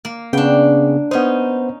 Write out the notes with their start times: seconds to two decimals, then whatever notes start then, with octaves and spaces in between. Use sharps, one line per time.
0.05 A#3
0.33 C#3 B3 D4 G5
1.11 B3 C#4 D#4 C5